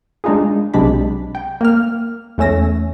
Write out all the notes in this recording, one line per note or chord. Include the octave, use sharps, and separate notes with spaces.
G#3 D4 D#4 F4 G#4
B1 C3 G#3 D4 D5 B5
G5
A#3 F6
E2 A3 C#4 E6 A#6